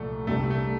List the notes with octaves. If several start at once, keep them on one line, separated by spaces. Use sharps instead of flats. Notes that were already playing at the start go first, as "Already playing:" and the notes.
Already playing: C2 A#2 F3 A3
C2 C3 G3 A3 D4 G4
A3